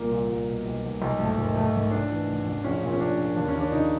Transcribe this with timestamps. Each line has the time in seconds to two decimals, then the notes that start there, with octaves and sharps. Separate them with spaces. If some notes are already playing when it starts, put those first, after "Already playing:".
Already playing: C2 A#2 A#3
0.11 A#2
0.29 C2
0.47 B2
0.66 B1
0.84 B1
1.02 B1
1.19 G#1 A3
1.37 G#1
1.55 G#1 A3
1.74 G#2
1.91 A1 D4
2.10 E3
2.28 A1
2.46 A1
2.64 A#1 C#4
2.82 A#2
2.93 C#4
3.00 A#2 D4
3.18 A#2
3.36 D#2 D4
3.48 C#4
3.55 D#2
3.60 D4
3.72 C#3 D#4